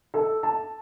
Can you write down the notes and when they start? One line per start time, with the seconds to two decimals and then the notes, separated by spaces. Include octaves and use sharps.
0.14 A4
0.43 A5